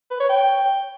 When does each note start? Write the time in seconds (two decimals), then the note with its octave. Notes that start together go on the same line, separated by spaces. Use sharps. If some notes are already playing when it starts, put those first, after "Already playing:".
0.11 B4
0.20 C#5
0.29 G5